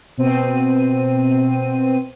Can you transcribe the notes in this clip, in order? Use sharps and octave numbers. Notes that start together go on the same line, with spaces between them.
B2 C4 D#7